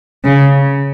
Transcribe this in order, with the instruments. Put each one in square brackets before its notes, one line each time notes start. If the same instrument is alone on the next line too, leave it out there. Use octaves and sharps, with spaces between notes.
[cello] C#3